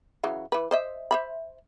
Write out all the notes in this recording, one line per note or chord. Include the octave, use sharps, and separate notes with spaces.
C#3 E3 F#3
E3 B4
C5 D#5 E5
C5 E5 B5